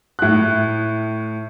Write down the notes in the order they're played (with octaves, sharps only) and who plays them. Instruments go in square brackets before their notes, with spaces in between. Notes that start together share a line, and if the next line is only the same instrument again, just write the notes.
[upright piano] A2 F#6